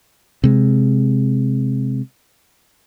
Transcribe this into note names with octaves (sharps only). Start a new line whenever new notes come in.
C3 G#3